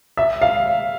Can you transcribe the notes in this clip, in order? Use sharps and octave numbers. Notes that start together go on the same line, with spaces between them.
E5
F5